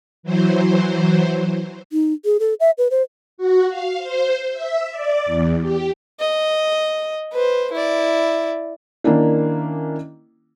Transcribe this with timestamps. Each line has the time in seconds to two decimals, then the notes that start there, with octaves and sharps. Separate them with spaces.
0.23 E3 F#3 C5
1.92 D#4
2.25 G#4
2.40 A4
2.60 E5
2.78 B4
2.91 C5
3.38 F#4
3.69 F5
3.98 C5
4.52 E5
4.91 D5
5.26 E2
5.62 G4
6.20 D#5
7.32 B4 C5
7.72 E4 D5
9.04 D#3 A#3 C#4 D4 E4